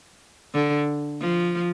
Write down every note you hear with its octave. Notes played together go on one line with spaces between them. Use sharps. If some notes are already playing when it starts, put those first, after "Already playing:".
D3
F3